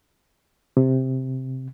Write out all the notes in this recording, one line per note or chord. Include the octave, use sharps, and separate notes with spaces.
C3